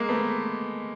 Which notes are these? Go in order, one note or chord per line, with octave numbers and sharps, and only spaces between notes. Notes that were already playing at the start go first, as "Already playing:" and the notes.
Already playing: G#3 A#3
A3 B3